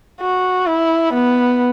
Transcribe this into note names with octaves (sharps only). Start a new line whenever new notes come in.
F#4
E4
B3